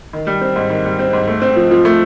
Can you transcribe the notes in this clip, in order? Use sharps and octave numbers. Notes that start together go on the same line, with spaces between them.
D#3
G3
C4
G#2
D#3
G3
C4
G#2
A3
C4
F3
F3
A3